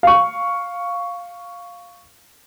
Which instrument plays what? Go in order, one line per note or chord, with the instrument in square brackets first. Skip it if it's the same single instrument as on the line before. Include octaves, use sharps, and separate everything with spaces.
[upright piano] F5 C#6